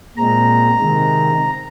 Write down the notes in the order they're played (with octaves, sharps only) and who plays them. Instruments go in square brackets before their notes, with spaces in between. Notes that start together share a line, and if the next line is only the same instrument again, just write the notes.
[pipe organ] A#2 G#3 C4 A#5
C3 D#3 G#3 C4